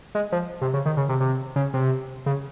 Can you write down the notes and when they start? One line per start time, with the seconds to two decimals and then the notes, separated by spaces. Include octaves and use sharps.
0.15 G#3
0.32 F3
0.62 C3
0.74 C#3
0.86 D#3
0.97 C#3
1.09 C3
1.20 C3
1.56 C#3
1.74 C3
2.26 C#3